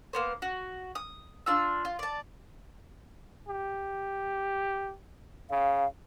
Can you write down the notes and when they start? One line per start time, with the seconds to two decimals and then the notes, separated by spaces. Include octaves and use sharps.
0.13 A#3 B3 C5
0.42 F#4
0.95 D#6
1.46 D4 F4 E6
1.85 F4
1.99 D5 A5
3.48 G4
5.50 C#3 F5